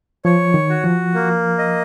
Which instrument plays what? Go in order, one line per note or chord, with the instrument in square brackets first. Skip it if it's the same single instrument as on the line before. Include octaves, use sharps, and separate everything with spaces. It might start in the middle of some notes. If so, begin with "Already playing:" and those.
[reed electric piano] F3 [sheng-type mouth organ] C#5
[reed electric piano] D#3
[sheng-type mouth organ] F#4
[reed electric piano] F3
[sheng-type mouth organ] A#3
D#5